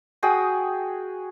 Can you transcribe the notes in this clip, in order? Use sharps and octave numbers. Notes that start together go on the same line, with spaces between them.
F#4 G#4 G5 D#6